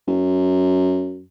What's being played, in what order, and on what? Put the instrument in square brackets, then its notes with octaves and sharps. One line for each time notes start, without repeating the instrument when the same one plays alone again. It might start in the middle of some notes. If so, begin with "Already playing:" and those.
[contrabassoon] F#2